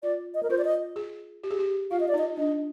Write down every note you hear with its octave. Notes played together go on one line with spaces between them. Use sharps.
F4 D5
D#5
A#4
F4 C5
D5
D#5
G#4
G4
G#4
G4
F4 F5
D#5
D5
D#4
D#5
D4 D#5